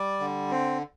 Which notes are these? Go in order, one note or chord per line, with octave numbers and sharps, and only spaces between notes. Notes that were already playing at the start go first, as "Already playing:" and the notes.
Already playing: G3 D5
D3
C4